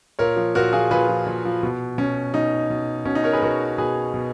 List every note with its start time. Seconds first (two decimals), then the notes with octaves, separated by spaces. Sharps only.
0.19 A#2 A#4 C#5
0.37 F3
0.55 A#2 F#4 A#4
0.73 F3 F4 G#4
0.91 A#2 G#4 B4
1.08 F3
1.27 A#2
1.45 F3
1.63 B2
1.98 B2 C#4
2.34 B2 D#4
2.70 B2
3.05 B2 C#4
3.15 D#4
3.24 A#4 C#5
3.33 G#4 B4
3.42 B2 F#4 A#4
3.78 B2 G#4 B4
4.14 B2